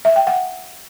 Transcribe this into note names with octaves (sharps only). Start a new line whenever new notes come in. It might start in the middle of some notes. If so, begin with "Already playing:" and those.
E5
G5
F#5